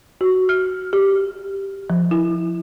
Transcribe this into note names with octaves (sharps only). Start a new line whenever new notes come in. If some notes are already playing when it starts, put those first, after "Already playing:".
F#4
F6
G4
F3
E4